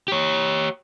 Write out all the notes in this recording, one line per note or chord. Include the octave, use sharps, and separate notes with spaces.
G4 C#5